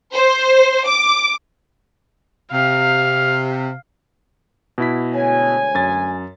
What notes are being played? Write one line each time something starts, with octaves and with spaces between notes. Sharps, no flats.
C5
D6
C3 F5
B2 E4 B6
D2 G#3 C#5 G#5
F#2 A6